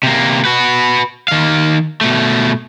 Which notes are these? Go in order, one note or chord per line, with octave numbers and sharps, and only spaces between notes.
C3 A#3
F#4 B4
D#3 F5
B2 A3